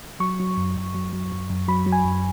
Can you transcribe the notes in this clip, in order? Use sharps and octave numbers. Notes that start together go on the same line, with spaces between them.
F#3 C#6
F#3
F#2
F#2
F#3
F#3
F#2
F#2
F#3 B5
F#3
G#5
F#2